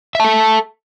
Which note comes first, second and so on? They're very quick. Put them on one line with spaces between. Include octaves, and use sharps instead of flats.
E5 A5 A4